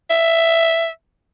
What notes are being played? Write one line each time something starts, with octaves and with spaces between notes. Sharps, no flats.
E5